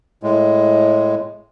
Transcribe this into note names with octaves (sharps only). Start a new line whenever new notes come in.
A2 G#3